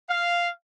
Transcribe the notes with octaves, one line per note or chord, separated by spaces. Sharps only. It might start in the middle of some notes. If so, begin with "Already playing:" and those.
F5